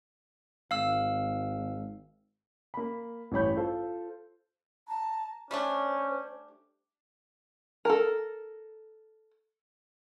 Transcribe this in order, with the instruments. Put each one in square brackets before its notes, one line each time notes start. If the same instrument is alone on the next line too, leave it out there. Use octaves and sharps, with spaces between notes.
[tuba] G#1 [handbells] F5 E6
[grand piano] A#3 B5
A1 G2 C#5 B5 G6
F4 A4 C5
[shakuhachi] A5 [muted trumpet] A#5
[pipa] G3 A3 D4 [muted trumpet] C#4 [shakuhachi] C5
[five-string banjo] A4 A#4